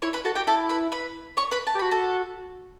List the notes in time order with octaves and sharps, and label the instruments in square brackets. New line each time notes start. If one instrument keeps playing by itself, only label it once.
[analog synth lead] E4 [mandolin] C#5 C#6
[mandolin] B4 B5
[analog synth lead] F#4 [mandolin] A4 A5
[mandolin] G4 G5
[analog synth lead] E4 [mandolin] A4 A5
[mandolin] B4 B5
B4 B5
C#5 C#6
B4 B5
A5
[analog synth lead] G4
[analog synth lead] F#4 [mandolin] B5
[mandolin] A4 A5